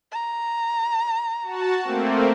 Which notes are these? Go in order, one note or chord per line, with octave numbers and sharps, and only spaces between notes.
A#5
F#4 A5
A3 A#3 C4